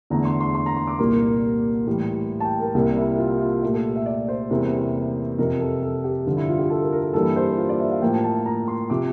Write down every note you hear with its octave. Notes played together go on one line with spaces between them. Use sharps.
E2 D3 A3 A#5
C6
C6
C6
A#5
C6
D6
C2 A#2 G3 A#3 C6
A2 E3 G3 A#3
A5
G5
A#4
C2 C3 G3 A#3 G4
E4
F4
F4
A#2 A3 G4
A4
E5
D5
C5
E2 C3 E3 G3 A#3
F2 C3 F3 A#4
A4
A4
G4
G2 D3 F3 F4
E4
F4
G4
A4
A#4
A#4
A4
G2 E3 G3 A#3 A4
C5
F4
D5
E5
F5
A2 F3 A#3 G5
A5
A5
A#5
C6
C3 F3 D6